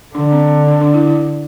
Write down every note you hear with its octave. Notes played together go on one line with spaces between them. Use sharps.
D3 D4
C4
D4
D4
E4
E4